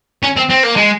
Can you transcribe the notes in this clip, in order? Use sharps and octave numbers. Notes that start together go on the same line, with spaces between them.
C#4
C4
C4
A#3
G#3